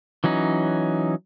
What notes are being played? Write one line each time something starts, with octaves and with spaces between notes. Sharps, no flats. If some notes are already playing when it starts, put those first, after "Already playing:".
E3 F#3 C#4 D#4